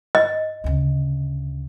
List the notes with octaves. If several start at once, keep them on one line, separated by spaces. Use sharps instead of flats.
D#5
D2 C#3